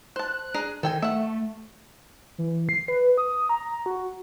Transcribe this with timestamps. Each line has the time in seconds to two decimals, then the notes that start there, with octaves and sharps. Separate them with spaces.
0.16 C5 A5 F#6
0.54 D4 G#4 A#5
0.83 D#3 A4 G5 G#5
1.02 A3 E5 F#5
2.38 E3
2.69 C7
2.88 B4
3.18 D#6
3.49 A#5
3.86 F#4